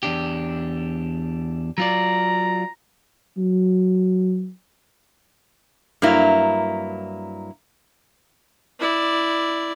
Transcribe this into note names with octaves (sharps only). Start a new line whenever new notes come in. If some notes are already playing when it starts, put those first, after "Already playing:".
E2 D4 G4
F#3 F4 D5 A#5
F#3
G2 F#3 A#3 E4
E4 D5